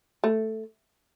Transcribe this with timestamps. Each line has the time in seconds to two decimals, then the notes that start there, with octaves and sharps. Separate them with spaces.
0.24 A3